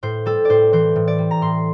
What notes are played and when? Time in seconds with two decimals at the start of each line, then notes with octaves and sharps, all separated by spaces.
0.03 A2 C5
0.26 G3 A4
0.45 A2 C5 D5
0.72 E3 C5
0.96 A2
1.07 D5
1.18 G3
1.31 A#5
1.41 A2 C6